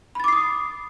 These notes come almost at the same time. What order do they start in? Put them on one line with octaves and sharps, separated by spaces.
B5 A6 D6 C7 D#6